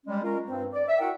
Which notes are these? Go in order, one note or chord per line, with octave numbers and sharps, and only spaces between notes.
G3 G#3 C#4
G#3 C#4 F4 A#4
G2 C4
D5
E5
E4 F#4 A#4 E5 F#5 G5